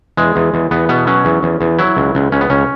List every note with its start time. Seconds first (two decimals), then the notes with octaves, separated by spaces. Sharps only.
0.17 E2 G#3
0.36 E2
0.54 E2
0.71 E2 B3
0.89 B2 B3
1.07 F#3 C#4
1.25 E2
1.43 E2
1.61 E2
1.79 F#3 E4
1.97 C#2
2.15 C#2
2.32 C#2 C#4
2.41 B3
2.50 C#2 C#4